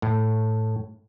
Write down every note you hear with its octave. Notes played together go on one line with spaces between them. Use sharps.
A2